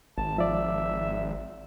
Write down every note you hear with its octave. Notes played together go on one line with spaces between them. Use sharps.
G#1 A5
F3 D5 E5